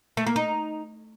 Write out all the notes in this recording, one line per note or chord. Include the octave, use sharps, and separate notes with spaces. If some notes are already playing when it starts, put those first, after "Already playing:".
A3
A#3
D#4